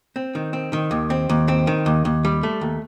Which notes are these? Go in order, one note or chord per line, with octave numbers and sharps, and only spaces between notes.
C4
D#3
C4
D#3
D#2
C4
D#2
C4
D#3
D#2
D#2
G3
A3
D#2